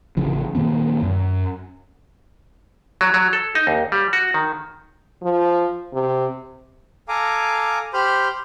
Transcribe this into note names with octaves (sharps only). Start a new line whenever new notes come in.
A1 C#3 F3
A#2 D#3 A#3 C4
F#2
F#3
F#3
A4
D#4
D#2
G3
F#4
D#3
F3
C3
A4 F5 G#5 A#5 D6
G4 C5 B5 C6 F6 G6